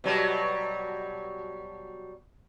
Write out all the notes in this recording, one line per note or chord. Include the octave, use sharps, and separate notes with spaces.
B2 F#3 G3